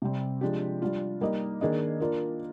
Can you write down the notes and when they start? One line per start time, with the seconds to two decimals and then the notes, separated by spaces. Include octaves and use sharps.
0.02 C3 G3 C4
0.41 F3 G#3 D4 G4
0.82 G3 D4 F4
1.21 G3 A#3 D#4 A#4 D#5
1.61 D#3 A#3 D4 G#4 D#5
2.00 A#3 D4 F4 A#4 D5